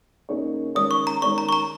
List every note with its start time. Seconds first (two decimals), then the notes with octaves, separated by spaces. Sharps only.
0.29 C#3 A#3 D#4 G#4 C#5
0.75 D#3 G#3 C#4 A#4 C#5 D#6
0.91 C#6
1.07 A#5
1.22 D#3 G#3 C#4 A#4 C#5 C#6
1.38 A#5
1.49 C#6
1.52 A#5